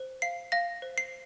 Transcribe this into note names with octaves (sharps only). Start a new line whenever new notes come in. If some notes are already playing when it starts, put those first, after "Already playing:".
Already playing: C5
F5 C7
F5 A#6
C5
C7